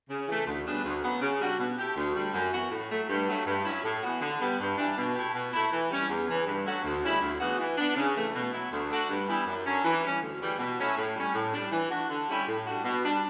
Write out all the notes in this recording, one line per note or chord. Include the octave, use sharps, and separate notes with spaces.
C#3
E3 A3
D2
C#3 G3 B3 D4
D2
C#3 F#3 B3
C#3
G3 D4 F#4
B2
A3 E4 G4
D2
D3 G3
F#2
E3 B3 F#4
A2
F#3 A3
G2
F#3 A3
G2
F#3 C#4 E4
A2
E3 B3 F#4
D3
G3 B3
G2
E3 G3 D4
B2
A3 E4 G4
B2
A3 E4
E3
G3 C#4
E2
C#3 E3
G2
F#3 A3 C#4 F#4
D2
C#3 G3 C#4 E4
D2
C#3 E3 B3 F#4
E3
B3 D4
C#3
E3 A3
B2
F#3 B3 E4
D2
D3 A3 D4 F#4
G2
E3 G3 B3 E4
F#2
D3 F#3 C#4
E3
G3 C#4
D2
C#3 E3 G3
B2
F#3 A3 C#4 E4
A2
G3 C#4
A2
G3 D4
E3
A3 D4 F#4
D3
G3 C#4 E4 G4
A2
G3 D4 F#4
B2
G3 D4